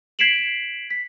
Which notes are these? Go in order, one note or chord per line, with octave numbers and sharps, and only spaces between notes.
G#6 B6 C7 D7 E7 F#7
B6